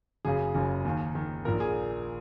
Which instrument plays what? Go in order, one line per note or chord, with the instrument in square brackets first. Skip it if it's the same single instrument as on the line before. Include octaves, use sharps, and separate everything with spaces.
[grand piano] F#1 F#2 C#3 G#4
F#1 F#2 C#3
D#2 D#3
D#2 D#3
A#1 A#2 A#4
G#4